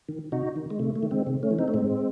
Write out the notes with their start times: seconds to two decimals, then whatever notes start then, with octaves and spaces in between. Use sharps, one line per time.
0.09 D#3
0.32 C3 D#4 F#4
0.56 D#3
0.70 G#3
0.80 C3 A3
0.96 A3
1.03 D#3
1.11 G#3 C4
1.27 C3
1.43 A3 C#4
1.51 E3
1.59 C4 D#4
1.68 A3
1.74 A2 G#3 C4